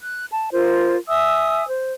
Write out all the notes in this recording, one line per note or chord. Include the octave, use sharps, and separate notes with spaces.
F#6
A5
F4 A#4 C5
E5 G#5 D#6 E6
C5